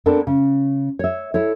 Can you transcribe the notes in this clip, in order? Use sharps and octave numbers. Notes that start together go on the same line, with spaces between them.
B3 C4 D4 A4 A#4
C#3
C#5 E5
E4 A4 C#5